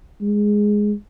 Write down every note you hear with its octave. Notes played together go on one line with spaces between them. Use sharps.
G#3